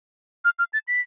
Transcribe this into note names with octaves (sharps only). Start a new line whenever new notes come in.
F6
F6
A6
B6